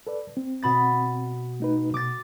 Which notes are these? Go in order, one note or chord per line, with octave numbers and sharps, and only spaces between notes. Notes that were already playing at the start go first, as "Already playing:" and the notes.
A4 B4 D5
C4
B2 B5 A6
A3 D#4 B4
B2 D6 A6